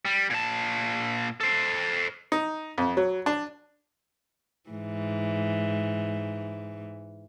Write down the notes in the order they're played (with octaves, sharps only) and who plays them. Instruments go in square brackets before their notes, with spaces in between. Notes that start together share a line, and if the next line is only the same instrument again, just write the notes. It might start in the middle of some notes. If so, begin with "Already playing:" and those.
[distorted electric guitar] G3
A#2 A5
A4 C5
[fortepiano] D#4
F2
F#3
D4
[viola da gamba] G#2 E3